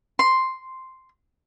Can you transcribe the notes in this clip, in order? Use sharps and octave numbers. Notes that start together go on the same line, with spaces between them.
C6